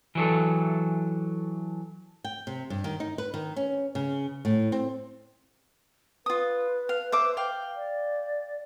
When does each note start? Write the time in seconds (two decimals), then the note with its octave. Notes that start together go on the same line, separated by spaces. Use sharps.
0.15 E3 F#3 A4
2.24 G5
2.47 C3
2.70 G2
2.84 D#3
3.00 D#4
3.18 B4
3.34 D#3
3.56 C#4
3.95 C#3
4.45 A2
4.72 C4
6.26 F4 B4 D#6
6.89 F5
7.12 C5 E5 D6
7.37 F5 G5 D6
7.76 D5